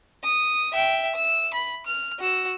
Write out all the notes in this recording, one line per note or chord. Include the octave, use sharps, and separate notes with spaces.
D#6
E5 G5
E6
B5
F6
F#4 E6